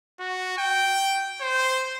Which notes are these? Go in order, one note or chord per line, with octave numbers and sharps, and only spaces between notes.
F#4
G5
C5